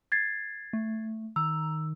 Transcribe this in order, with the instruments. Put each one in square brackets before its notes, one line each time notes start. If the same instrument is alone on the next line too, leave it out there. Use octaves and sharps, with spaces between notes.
[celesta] G#6 A6 C7
[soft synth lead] A3
[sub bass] D#3 [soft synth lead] A#5 [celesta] E6